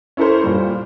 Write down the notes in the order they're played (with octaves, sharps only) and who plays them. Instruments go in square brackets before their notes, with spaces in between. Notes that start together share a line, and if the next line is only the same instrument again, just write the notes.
[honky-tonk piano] C#4 E4 A4 A#4 C5
A#2 G3